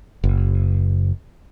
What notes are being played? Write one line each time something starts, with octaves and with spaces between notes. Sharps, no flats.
F#1